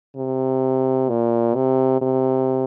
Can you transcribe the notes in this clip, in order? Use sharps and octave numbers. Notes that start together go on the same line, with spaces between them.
C3
A#2
C3
C3